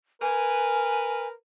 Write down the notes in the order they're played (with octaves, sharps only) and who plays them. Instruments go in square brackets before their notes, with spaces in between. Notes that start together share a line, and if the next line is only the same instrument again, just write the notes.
[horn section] A#4 B4 [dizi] G#5